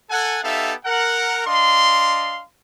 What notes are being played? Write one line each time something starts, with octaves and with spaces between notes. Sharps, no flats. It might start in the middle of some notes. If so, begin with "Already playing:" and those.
A4 F#5 G#5
B3 D#4 G4 A4 E5 F5
A#4 F#5
D4 D#5 F5 C6